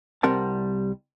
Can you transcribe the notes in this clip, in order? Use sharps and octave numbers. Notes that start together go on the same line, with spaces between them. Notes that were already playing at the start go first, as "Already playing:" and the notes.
C2 G3 C4 A#4 F#5 A5